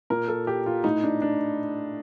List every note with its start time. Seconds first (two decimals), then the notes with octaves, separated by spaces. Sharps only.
0.10 A#2 A#4
0.28 A4
0.47 G4
0.66 F4
0.84 A2 D#4
1.03 D4
1.22 D4